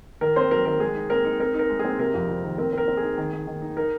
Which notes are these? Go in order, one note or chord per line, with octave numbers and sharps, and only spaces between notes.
D#3 A#4
C4 C5
F#3 A#4
D#3 A#4
G#3 G#4
D#4
C4 A#4
D#4
C4 A#4
D#4 A#4
G#3
G#4
C4
C3 A#4
F2
C3
D#3
C4 A#4
C4 A#4
C4
G#4
D#4
D#3
D#3
D#3
D#4
D#4 A#4